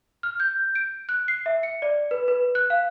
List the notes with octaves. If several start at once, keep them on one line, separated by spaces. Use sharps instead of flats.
F6
G6
D7
F#6
C7
E5
C#7
D5
B4
B4
F#6
F5